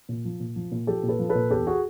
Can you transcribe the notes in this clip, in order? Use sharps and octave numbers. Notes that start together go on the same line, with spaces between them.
A#2
F3
A#2
F3
A#2
F3 G4 A4
A#2
A4 B4
F3
A4 B4
A#2
E2 G4 A4
F#4 G#4